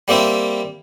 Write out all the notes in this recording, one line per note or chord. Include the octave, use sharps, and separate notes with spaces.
G3 A#3 C4 E4